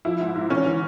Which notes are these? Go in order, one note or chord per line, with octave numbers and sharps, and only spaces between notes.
F3 E4
G#2
G#2
E3 C#4
E3